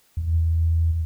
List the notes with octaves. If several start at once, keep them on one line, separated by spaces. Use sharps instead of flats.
E2